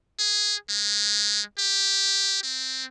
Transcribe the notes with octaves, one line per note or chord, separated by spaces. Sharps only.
G#4
G#3
G4
C4